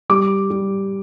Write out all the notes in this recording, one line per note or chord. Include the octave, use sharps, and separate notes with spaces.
G3 D6
G3